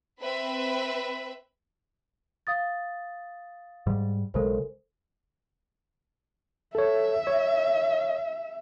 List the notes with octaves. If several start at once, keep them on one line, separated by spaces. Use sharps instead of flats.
C4 B4 E5 B5
F5 D#6 A6
G#2 G3
B1 C#3 G#3 A4 A#4 C5
A4 C#5 E5
C#5